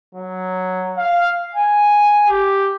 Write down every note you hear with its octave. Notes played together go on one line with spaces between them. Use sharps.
F#3
F5
G#5
G4